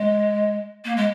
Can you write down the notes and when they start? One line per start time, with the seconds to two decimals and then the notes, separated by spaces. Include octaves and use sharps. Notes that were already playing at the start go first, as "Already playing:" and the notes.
Already playing: G#3
0.84 A#3
0.96 G#3